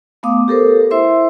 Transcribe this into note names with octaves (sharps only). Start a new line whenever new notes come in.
A3 B3 F5 D6 D#6
G4 A4 A#4 C5
E4 C5 E5 C6